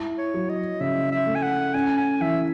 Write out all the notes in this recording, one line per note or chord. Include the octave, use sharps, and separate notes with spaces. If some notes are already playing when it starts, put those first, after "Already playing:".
Already playing: E4
C#5
F#3
D#5
C#3 E5
E5
A3
G#5
F#5
C#4 G#5
G#5
E3 E5